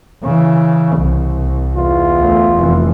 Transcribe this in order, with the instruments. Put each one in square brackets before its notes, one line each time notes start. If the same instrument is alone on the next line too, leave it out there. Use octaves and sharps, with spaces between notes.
[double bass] C#3 E3
C2
[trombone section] E2 F4
[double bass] D2
F1 E3